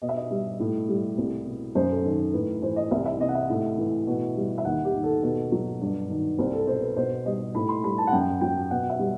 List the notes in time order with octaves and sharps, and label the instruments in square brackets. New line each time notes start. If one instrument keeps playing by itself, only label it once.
[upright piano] B2 D#5
E5
D#5
G3
A2
G3
C2
B2
F#2 C5
A4
D#3 A4
A2 B4
E3 C5
D#5
C2 E5
E5
C3 D#5
F#5
E5
A2
E3
B2
G3
E5
D#2 F#5
G4
D#3
A4
B2
F#3
G2
D#3
C2 C5
A4
B2 C5
B4
B2 C5
G3 D#5
A2 B5
C6
G3 B5
A5
F#5
F#2 G5
F#3 G5
B2 F#5
E5
G3